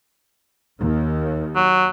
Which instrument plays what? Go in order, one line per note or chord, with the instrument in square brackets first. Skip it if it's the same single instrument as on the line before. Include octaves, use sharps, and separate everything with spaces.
[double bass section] D#2
[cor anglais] F#3